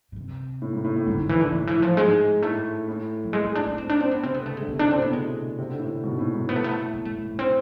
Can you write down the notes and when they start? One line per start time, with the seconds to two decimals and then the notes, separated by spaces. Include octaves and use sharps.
0.12 B2
0.16 C3
0.62 A2
0.73 G#2
0.84 A2
0.96 A2
1.07 G#2 D3
1.18 D3
1.29 E3
1.41 D3
1.52 A2 D3
1.67 E3
1.82 F3
1.97 G#2 G#3
2.42 A2 A3
2.88 A2
3.24 F3
3.33 G#3
3.44 C4
3.55 D4
3.67 D4
3.78 C4
3.89 D4
4.00 C4
4.11 B3
4.23 C3 C4
4.34 D3 B3
4.46 C3 A3
4.57 D3 G#3
4.68 B3
4.73 C3
4.79 D4
4.86 D3
4.91 C4
4.98 A2 C3 B3
5.13 B2 D3 G#3
5.59 C3
5.69 D3
5.79 A2 C3
6.04 G#2 B2
6.19 A2
6.34 G#2
6.49 A2 B3
6.56 A3
6.64 B3
6.71 A3
6.94 B3
7.05 A3
7.16 A3
7.28 A3
7.39 C4